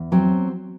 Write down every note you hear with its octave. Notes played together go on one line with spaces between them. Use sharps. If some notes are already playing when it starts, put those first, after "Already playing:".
Already playing: E2
F#3 C4